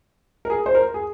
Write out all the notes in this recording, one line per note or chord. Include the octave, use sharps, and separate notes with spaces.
A#4
G#4
C5
A#4
G#4